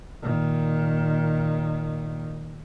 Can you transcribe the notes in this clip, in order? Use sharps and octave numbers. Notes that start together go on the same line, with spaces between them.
A#2 D#3